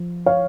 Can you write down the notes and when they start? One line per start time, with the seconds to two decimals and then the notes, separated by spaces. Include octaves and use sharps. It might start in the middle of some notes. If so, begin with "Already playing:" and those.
Already playing: F3
0.26 C#5 F5